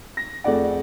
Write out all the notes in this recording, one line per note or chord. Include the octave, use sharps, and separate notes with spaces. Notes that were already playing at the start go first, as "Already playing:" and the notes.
A#6
F2 A3 G#4 D5 F#5